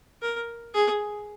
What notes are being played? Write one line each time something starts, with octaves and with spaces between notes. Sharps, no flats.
A#4
G#4